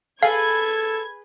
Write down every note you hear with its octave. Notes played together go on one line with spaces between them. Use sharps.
G#4 A4 B4 F5 G#6